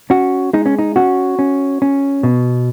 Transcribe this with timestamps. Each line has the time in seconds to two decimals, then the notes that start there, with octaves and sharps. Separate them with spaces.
0.10 C#4 F#4
0.53 G#3 D#4
0.66 C#4
0.79 D#4
0.96 C#4 F#4
1.39 C#4
1.82 C#4
2.23 B2